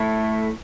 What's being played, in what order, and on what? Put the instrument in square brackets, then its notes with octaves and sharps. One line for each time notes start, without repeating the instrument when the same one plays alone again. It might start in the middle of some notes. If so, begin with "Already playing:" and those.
Already playing: [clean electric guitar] A3 E4 A4